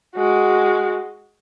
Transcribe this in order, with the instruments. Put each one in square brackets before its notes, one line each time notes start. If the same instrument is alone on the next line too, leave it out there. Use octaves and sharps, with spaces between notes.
[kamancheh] G#3 F#4